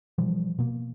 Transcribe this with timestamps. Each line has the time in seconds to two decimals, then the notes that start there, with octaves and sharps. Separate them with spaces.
0.18 B2 E3 F3 G3
0.59 B2 A#3